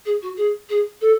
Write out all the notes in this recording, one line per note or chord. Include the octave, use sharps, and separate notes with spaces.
G#4
F#4
G#4
G#4
A4